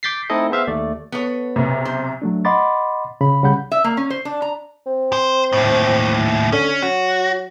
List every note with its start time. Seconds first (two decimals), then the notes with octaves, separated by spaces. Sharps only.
0.03 D6 G6 A6 B6 C7
0.30 A3 C4 D#4 E4 A4 D#5
0.50 B3 G#4 C5 E5 F5
0.67 D#2 A3 D5
1.12 B3 A4 C#5
1.56 B1 C3
1.85 C5
2.22 F#3 A3 D4
2.45 D#5 F#5 B5 C6 D6 A6
3.21 C#3 B5
3.43 C2 C#3 G3 F#5 B5 G6
3.72 E5
3.84 A#3
3.97 C#4
4.10 C5
4.25 D4
4.42 A#5
4.86 C4
5.13 C5
5.53 D#2 A2
6.52 D3 C#4
6.82 F#3 F#4